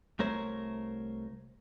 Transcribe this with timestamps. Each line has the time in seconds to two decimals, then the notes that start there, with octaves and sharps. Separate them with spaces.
0.19 C2 A3 A#4 C5 C#5